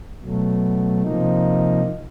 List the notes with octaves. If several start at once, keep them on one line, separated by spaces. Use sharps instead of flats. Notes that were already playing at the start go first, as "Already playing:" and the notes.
B2 F#3 A3
C3 F3 A#3 D#4